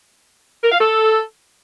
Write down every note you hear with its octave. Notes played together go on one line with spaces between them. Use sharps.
A#4
F5
A4